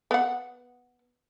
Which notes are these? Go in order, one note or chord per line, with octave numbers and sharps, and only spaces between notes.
B3 F#5